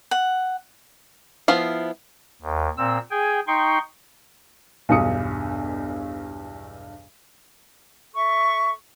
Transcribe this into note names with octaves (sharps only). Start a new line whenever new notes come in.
F#5
F3 B3 E4 F5
D#2
A#2 C4 E6
G#4 G5 G#5
D#4 G5 C6 C#6
B1 E2 G2 D#6 C#7
A4 E5 C#6